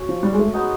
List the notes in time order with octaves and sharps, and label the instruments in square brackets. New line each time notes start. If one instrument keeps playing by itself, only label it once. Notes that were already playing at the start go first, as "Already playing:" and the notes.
Already playing: [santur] C#4 F#4
[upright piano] F3
G3
G#3
A3
[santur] G#3 B3 D#4 F#4